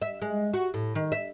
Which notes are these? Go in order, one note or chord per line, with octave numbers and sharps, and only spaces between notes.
E5
G#3
F#4
A2
D#3
E5